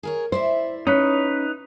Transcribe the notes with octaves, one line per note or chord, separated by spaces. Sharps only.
G#4 A#4 C#5
E4 C5 D5 E5
C#4 D#4 B4